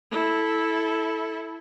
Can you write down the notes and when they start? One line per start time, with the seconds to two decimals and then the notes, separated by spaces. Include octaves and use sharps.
0.11 E4 A4